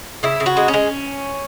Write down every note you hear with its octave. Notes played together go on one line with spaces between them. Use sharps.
C#3 E4
C#3
F#4
G#3
C#4
G#3